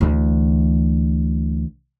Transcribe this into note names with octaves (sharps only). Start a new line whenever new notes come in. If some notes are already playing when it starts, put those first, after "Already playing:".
D2 E3